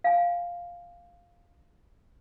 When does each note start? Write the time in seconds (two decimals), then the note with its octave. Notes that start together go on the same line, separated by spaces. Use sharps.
0.04 F5 G#5